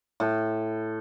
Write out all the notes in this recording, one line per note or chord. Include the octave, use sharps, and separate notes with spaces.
A2 A4